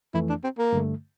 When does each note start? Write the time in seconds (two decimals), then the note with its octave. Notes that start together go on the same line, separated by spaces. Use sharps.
0.14 F2 E3 A3 E4
0.29 D4
0.44 C4
0.58 A#3
0.73 G2 D3 A3